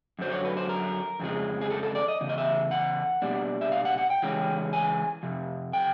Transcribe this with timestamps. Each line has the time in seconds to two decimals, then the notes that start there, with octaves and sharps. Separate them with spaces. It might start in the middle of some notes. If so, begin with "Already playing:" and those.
0.19 F#2 D3 F#3 C5
0.32 C#5
0.45 B4
0.57 C5
0.69 A#4
1.20 F2 C#3 F3 G#3
1.61 G#4
1.70 A4
1.83 A4
1.95 D5
2.08 D#5
2.21 E2 C#3
2.29 D#5
2.38 E5
2.71 F#5
3.22 B2 G3 A#3 D4
3.61 E5
3.72 F5
3.85 F#5
3.98 F#5
4.10 G5
4.22 C#3 E3 G#3 C#4
4.73 G#5
5.23 F2 C3
5.73 G5